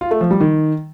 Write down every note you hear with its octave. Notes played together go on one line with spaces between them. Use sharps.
F4
A3
F3
G3
D#3